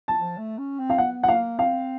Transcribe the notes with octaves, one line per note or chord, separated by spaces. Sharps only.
A5
F3
A3
C#4
C4
F5
B3 F#5
F#5
A#3 F5
C4 F5